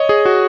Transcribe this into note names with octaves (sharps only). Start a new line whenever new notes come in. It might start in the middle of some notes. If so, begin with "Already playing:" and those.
Already playing: C#5 D#5
G#4
F#4